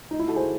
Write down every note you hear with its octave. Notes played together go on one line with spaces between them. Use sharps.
D#4
E4
F#4 A4
G#4 C5